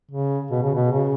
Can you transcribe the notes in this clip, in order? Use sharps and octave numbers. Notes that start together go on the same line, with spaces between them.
C#3
B2
C#3
B2
C#3